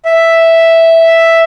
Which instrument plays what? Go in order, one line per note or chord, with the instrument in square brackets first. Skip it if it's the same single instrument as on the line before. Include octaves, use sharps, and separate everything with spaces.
[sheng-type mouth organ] E5